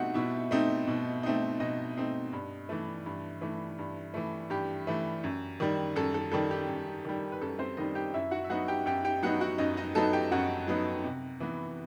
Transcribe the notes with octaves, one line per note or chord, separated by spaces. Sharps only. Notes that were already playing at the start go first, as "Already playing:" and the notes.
Already playing: B2 A3 C4 D#4 F#4 G4 F#5
B2 E4 E5
A3 C4 D#4
B2
A3 C4 D#4
B2 D#4 D#5
A3 C4 D#4
G2
E3 A3
G2
E3 A3
G2
E3 A3
G2 G4
E3 A3
F#2
D#3 G3
F#2 A4
A4
D#3 G3 A4
G4
F#2
D#3 G3
B4
F#2 A4
C4 C5
D#3 G3 D#4 D#5
G4 G5
F#2 E4 E5
F#4 F#5
E5
F#3 B3 D#4 F#4 F#5
G4 G5
F#2 G4 G5
G4 G5
F#3 B3 D#4 F#4 F#5
F#4 F#5
F#2 D#4 D#5
D#4 D#5
F#3 B3 D#4 A4 A5
G4 G5
F#2 F#4 F#5
F#3 B3 D#4
C3
E3 B3